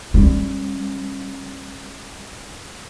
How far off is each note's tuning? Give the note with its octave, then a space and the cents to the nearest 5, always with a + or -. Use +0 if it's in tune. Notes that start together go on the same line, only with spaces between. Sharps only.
G3 +20 C#4 -30